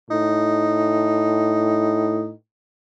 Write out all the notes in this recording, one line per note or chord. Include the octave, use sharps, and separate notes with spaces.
A2 D#4